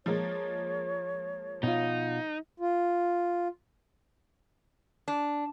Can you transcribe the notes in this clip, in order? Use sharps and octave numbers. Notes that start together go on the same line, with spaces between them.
F3 G#3 A#3 C#5
B2 D#4 F4
F4
D4